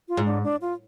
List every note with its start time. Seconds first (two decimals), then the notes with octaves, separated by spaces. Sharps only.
0.09 F4
0.17 G#2
0.26 D4
0.43 D4
0.61 F4